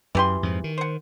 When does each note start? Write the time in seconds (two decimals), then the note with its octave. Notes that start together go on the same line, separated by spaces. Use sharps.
0.15 F#2 E3 G4 C6
0.43 F2 G#2 F3
0.64 D#3
0.78 C5 F#5